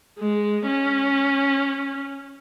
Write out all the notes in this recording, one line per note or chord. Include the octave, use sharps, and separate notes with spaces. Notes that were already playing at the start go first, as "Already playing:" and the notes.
G#3
C#4